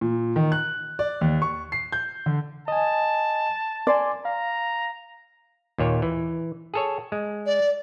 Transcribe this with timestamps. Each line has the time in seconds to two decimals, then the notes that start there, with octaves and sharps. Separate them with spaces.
0.01 A#2
0.36 D#3
0.52 F#6
0.99 D5
1.21 D#2
1.42 C#6
1.72 C7
1.92 G6
2.26 D3
2.68 D#5 G#5 A5
3.87 D5 G#5 C6 D6
4.25 F5 A#5
5.78 D#2 A#2 C#5
6.02 E3
6.74 G#4 A4 C#5
7.12 G#3
7.46 D5